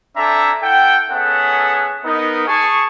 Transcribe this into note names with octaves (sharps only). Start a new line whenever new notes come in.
C4 D4 A4 E5 G#5 A#5
E4 A4 F#5 G5
B3 C#4 G#4 A4 E5 F#5
B3 D#4 A#4
G#4 G#5 A5 C#6